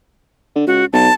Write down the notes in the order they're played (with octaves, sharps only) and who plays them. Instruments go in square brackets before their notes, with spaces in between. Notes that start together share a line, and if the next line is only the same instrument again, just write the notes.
[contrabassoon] D3
[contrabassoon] C#2 [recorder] F#4
[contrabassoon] B1 [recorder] A5